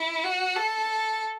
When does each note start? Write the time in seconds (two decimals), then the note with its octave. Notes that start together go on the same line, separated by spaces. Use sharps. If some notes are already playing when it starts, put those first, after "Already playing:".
Already playing: E4
0.24 F#4
0.56 A4